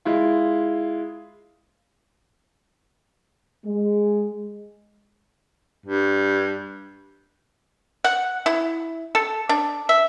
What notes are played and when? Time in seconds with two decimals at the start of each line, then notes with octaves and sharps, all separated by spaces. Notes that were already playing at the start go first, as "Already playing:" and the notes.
0.05 G#3 E4 F4
3.66 G#3
5.86 G2
8.04 F#5
8.46 E4
9.15 A4
9.49 D4
9.89 E5